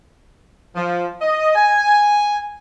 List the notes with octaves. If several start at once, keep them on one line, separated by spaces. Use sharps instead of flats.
F3
D#5
G#5